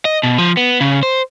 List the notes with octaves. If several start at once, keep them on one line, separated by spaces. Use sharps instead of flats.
D#5
B2
F3
B3
C#3
C5